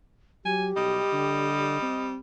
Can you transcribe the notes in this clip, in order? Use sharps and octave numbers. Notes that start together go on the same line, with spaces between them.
F#3 G4 G#5
B1 G3 D#5
D3
C4